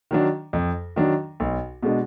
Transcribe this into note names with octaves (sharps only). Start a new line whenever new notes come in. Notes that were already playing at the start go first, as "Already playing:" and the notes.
D#3 F#3 D4
F2
D#3 F#3 D4
B1
B2 G#3 D4